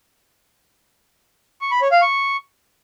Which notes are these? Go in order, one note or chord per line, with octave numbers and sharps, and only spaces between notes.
C#6
B5
C#5
F5
C#6